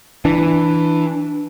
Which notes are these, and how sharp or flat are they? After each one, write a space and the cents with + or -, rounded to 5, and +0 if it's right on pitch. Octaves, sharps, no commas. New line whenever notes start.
E3 +0 D4 +10